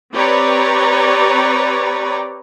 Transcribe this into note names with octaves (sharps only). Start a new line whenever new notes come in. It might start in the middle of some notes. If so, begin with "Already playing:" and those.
C4 G4 B4 C#5 D5 A#5